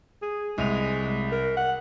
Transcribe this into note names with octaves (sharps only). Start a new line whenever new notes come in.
G#4
C2 G#3 F7
A#4
F#5